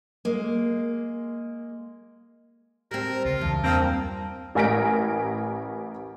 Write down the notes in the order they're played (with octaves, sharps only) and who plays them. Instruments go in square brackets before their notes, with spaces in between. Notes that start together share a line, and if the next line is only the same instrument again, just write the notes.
[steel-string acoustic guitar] G#3 A#3
[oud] G3 C4 [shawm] A#4
[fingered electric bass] C#2 [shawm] F4
[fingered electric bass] E2 [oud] G2
[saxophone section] A#2 A#3 C4 [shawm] A#5
[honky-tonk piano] A1 A#4 G#5 A#6 B6 D7